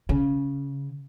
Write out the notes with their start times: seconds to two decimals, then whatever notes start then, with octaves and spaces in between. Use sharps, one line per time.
0.09 C#3